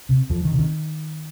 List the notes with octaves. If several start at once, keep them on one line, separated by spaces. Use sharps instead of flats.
C3
F2 F3
D#3
C3
D#3